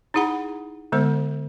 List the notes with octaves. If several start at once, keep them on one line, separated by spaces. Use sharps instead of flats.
D#4 E4 G#4 F#5 B5
D3 G#3 B3 C5